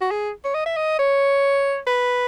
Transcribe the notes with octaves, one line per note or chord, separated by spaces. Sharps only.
F#4
G#4
C#5
D#5
E5
D#5
C#5
B4